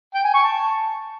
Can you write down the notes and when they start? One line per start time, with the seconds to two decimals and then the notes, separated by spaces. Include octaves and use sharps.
0.14 G5
0.24 G#5
0.34 C#6
0.44 A5